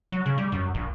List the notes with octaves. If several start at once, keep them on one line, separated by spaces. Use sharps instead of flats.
F#3
C#3
G3
F#2
A#1